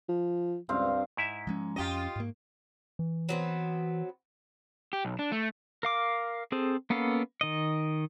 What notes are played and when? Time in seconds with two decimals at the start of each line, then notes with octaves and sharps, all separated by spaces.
0.09 F3
0.69 C#2 G2 C4 F5
1.17 G#2 E4 E5
1.47 F3 G#3 C#4
1.76 F2 C#4 F4 G4 D#5
2.16 G#2 A#3
2.99 E3
3.29 F#3 B3 C4
4.93 G4
5.05 B1
5.19 D4
5.32 A3
5.83 A#4 F5 D6
6.52 C4 G#4 A4 C5
6.90 A#3 B3 C#4 A4 F5
7.41 D#3 D#5